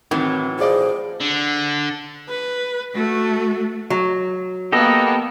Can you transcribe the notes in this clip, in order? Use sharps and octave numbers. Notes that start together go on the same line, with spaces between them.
A2 D#3 E3 F#3 C4
F4 G#4 C5 D5 D#5
D3
B4
A3 F#4
F#3
A#3 B3 G4 A4 D#5